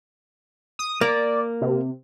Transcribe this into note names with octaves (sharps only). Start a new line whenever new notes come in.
D#6
A#3 D5
C3